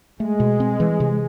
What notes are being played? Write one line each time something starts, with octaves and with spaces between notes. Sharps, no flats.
G#3 A3
B2
C4
E3
C3